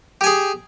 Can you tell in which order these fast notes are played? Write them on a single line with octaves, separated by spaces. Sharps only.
G4 G#5 G#4